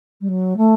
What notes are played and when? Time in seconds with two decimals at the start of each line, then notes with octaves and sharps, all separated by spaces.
0.21 G3
0.28 F#3
0.57 A3